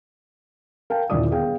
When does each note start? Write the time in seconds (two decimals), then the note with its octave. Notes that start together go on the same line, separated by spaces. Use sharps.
0.90 A#4 F5 G5 A5
1.10 D#1 D#2 D3 E4 D5 D#6
1.31 B3 G#4 F5 G5